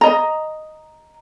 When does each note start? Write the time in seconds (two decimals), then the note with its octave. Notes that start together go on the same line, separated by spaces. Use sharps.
0.01 D#5 A#5